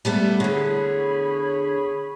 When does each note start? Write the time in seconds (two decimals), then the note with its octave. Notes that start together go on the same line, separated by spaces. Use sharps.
0.05 G3 A3 B3
0.40 E2 D3 G#4 C#5 B5